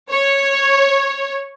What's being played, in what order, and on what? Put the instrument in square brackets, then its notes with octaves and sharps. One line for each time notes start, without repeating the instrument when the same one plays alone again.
[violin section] C#5